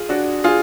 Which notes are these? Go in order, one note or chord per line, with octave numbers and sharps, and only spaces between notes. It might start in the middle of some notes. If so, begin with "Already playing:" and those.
Already playing: F4 G#4
D4 F#4
F4 G#4